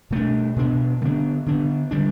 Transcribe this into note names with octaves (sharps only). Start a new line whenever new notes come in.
B2 A3 D4
B2 B3 D4
D3 G3 B3 D4
D3 B3 D4
D3 G3 D4